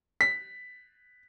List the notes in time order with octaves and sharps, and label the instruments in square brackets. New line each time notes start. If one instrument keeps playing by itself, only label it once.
[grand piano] B6